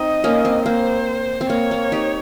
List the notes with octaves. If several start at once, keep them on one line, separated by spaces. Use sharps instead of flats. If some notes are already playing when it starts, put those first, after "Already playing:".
Already playing: C4 D#4 D#5
A#3 C#4
C4
A#3 C5
C4
A#3 C#5
A#3
D#4 G4